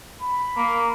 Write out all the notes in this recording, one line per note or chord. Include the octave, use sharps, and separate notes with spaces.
B5
A#3